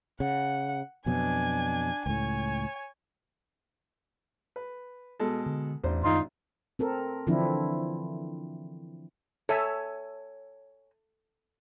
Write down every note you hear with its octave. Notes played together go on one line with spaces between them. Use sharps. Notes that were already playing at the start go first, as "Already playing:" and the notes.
C#3 F#5
F2 B2 F#3 D4 G#5
C#2 A2 C#5 G#5
B4
B2 G#3 A4
D3
A1 E2 D4 C5
F#2 D#3 G#3 D#4 F4
C4 A4 A#4
D3 E3 F3 C4 D4 E4
A4 C#5 E5 G#5